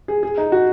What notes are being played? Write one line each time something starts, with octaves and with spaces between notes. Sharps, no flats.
G#4
G#4
D#4
F#4